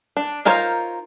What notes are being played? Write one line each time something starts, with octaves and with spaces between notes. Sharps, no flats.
D4
D#4 F4 A#4 C5 C#5